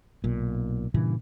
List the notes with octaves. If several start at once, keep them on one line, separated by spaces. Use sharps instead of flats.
B1 A#2
G2 A#2 C#3 E3